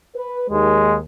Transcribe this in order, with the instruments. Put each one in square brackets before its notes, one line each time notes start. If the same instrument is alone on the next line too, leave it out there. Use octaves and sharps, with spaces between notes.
[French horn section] B4
[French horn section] D#2 [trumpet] G#3